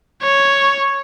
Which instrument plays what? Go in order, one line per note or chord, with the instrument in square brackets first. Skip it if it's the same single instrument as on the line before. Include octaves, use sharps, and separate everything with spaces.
[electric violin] C#5